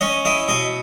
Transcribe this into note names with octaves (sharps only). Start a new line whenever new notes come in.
C#4 D#5
E4 D#5
B2 D#5